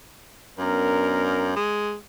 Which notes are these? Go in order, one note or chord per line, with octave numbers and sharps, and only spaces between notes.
F#2 B3 D4 A#4
G#3